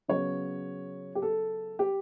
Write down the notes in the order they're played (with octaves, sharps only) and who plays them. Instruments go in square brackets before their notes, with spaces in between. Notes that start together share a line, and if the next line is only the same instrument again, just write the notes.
[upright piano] C#3 F#3 B3 C#5
G4
A4
G4